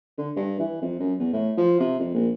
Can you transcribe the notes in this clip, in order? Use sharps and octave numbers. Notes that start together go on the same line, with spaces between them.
D3
G2
E3
F2
F#2
E2
A2
F3
C3
F2
A#1